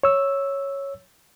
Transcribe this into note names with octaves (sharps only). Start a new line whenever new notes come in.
C#5 E6